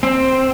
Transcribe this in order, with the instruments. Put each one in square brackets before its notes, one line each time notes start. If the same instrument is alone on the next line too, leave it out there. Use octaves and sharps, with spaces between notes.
[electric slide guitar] C4